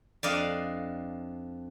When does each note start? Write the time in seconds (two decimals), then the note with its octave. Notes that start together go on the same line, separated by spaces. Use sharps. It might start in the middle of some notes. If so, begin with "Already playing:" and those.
0.23 F2 D4 D5 D#5 F5